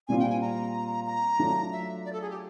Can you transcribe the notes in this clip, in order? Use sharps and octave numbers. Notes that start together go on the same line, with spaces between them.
A#2 G3 C4 F4 G#5
G5
G#5
A#5
A#5
F#3 A3 D4 F4
E5
D5
A4
G#4
G4